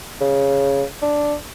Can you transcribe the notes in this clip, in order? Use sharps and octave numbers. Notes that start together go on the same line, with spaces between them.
C#3
D4